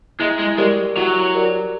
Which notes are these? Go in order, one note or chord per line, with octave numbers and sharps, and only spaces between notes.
G#3 E4
G#3
G#3 G4 A#4 D5
F#3 E4
G4 A#4 D5